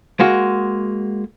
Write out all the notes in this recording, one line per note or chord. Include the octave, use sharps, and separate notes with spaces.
G#3 A#3 F#4